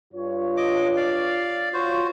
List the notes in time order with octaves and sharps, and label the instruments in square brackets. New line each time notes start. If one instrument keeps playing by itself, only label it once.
[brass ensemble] G2 F4 C#5
[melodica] D#5 D6
D5 F5
[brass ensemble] F4 C#5 [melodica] F#4 C5